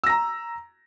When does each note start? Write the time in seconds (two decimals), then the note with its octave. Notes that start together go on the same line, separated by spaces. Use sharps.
0.04 E6
0.07 A#6
0.10 A#5